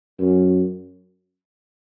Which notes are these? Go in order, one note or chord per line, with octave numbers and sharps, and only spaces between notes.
F#2